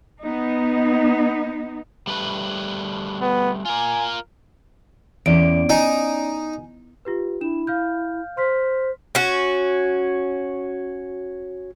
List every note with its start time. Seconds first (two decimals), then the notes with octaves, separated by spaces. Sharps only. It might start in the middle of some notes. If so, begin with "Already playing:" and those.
0.22 B3 D#4
2.07 G3 A3 B4
3.22 B3
3.65 F4 A#4 G#5
5.26 E2 C#4 D5 D7
5.70 D#4 G#5
7.05 F4 G4 B4
7.41 D4 E4 E7
7.67 F5 F6 G6
8.37 C5 C6 F6 B6
9.15 C#4 F#4